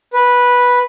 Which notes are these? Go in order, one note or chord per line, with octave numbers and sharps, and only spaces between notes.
B4